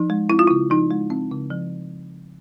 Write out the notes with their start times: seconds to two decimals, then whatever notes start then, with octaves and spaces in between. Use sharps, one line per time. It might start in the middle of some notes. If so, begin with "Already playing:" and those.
Already playing: F3 D#4
0.10 G#3
0.30 C4 E4
0.39 F4
0.48 C#3 E4
0.70 F3 D#4
0.91 G#3
1.10 C4
1.32 C#3
1.51 F3